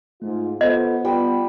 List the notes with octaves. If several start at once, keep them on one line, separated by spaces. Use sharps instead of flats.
G#2 A3 F4
B3 F4 A4 C5 D#5
G3 F4